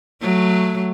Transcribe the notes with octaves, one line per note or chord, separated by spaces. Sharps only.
F#3 A3